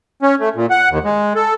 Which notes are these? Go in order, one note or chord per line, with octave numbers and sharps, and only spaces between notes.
C#4
A3
A#2
F#5
D#2
G#3
A4